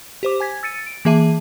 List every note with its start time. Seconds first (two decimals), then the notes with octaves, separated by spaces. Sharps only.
0.23 G4 C5 D6
0.40 G#5 G#6 B6
0.63 E6 A6 C#7 D#7
0.87 D7
1.05 E3 A#3 G#4 E5 A5 D#7